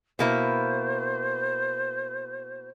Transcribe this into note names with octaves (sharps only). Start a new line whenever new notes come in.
B2 A#3 E4 C5